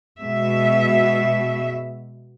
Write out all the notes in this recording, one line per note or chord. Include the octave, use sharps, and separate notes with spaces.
B2 G#3 E5